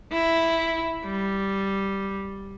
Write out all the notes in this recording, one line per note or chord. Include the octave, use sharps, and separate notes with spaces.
E4
G3